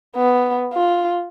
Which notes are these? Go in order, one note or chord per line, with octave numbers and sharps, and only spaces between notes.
B3
F4